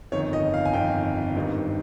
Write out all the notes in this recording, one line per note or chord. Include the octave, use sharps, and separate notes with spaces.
G1 F2 D#3 C#5
D#5
F5
G#5
G1 F2 D#3 G5
G#1 G2 D#3